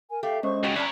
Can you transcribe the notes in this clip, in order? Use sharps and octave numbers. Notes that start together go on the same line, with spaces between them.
A#4 G#5
A3 G4 A4 F5
G2 G#3 C#4 C5 D#5 C#6
D#2 C#3 F#4 G4 C#6
G3 C#4 C#5 D5 E5 A5 A#5 F#6